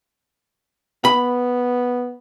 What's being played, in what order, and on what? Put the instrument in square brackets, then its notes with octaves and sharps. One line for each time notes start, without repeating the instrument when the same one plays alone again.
[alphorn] B3 [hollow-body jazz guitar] B5